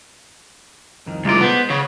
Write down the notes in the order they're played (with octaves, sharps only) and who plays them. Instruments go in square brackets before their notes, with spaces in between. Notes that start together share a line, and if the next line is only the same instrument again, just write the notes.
[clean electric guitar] C2 F2 D#3
[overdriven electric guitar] C2 F4 [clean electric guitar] G#3 A#3 D5
[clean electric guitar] G#3 C5 [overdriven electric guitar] B3
[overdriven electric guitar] C#3 [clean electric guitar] B3 F#4